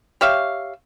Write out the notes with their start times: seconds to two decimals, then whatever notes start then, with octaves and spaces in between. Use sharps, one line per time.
0.21 G4 C#5 E5 F5